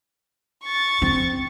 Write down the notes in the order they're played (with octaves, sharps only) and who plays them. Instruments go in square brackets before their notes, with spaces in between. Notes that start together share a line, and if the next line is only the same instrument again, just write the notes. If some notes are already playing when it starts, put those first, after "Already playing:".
[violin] C#6 A6
[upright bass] C4